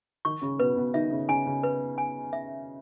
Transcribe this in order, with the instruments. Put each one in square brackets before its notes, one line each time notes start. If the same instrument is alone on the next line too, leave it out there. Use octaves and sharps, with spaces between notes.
[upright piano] D#3 D#4 [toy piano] C#6
[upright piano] C#3 C#4
[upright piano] B2 B3 [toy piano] B4
[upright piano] B2 B3
[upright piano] D#3 D#4 [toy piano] E5
[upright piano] C#3 C#4
[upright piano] C#3 C#4 [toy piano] G#5
[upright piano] C#3 C#4
[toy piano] B4
G#5
E5